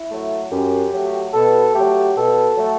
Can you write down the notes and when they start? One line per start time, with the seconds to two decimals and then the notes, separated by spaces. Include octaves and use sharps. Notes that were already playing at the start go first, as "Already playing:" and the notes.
Already playing: E4
0.10 F#3 A3
0.51 F#2 G4
0.93 F#3 A3
1.34 B2 A4
1.75 F#3 A3 G4
2.16 B2 A4
2.58 F#3 A3